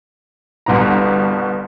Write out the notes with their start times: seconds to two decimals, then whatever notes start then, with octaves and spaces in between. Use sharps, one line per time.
0.66 G1 C2 B2 A#5